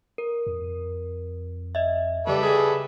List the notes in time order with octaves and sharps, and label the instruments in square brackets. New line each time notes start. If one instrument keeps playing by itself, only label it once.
[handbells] A#4
[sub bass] F2
[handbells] D#5 E5
[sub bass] C#3 [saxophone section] G3 [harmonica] A4 B4 D5
[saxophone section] G4 G#4